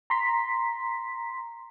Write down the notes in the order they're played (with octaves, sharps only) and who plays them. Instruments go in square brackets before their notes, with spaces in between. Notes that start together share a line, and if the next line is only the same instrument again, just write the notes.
[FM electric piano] A#5 C6 B6